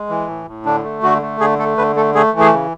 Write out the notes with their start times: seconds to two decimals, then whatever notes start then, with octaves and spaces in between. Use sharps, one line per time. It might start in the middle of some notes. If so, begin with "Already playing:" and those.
Already playing: G#3
0.09 E3
0.27 A2
0.47 A2
0.65 D3 D4
0.84 A3
1.03 D3 F#4
1.22 A3
1.40 D3 G#4
1.58 A3 A4
1.78 D3 B4
1.96 A3 A4
2.15 A3 G#4
2.33 E3
2.40 G#4
2.53 C#3